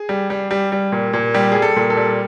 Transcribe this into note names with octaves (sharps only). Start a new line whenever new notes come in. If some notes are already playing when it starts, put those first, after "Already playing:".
Already playing: G#4
G3
G3
G3
G3
A#2
A#2
G3 G4
G3 G#4
A4
A#2
A4
G3